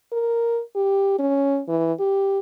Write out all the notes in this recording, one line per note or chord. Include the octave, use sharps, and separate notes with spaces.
A#4
G4
C#4
E3
G4